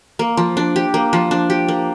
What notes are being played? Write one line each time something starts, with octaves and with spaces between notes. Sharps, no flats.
A#3
F3
D4
G4
A#3
F3
D4
G4
A#3